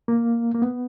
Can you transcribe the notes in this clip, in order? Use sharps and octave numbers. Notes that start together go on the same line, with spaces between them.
A#3
A#3
B3